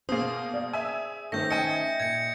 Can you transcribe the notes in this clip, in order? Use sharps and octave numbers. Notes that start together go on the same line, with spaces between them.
B2 A#3 G#4 C5 D#6
D5 F5
E5 G#5
D#3 A3 C#4 C5 G6 A#6
D#5 E5 G5 G#5 C#7
A#2 G#6 C#7